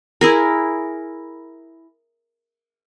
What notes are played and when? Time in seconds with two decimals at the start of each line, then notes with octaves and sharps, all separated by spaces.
0.21 E4 G#4 A#4